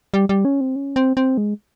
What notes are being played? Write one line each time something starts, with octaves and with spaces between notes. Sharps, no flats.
G3
G3
C#4
C4
C#4
C4
C4
G#3